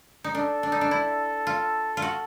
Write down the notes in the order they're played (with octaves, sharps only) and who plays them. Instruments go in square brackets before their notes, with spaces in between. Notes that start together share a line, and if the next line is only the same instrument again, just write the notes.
[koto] D#4
[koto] D4 [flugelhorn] A4
[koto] D4
D#4
D4
E4
F4
F4
F#4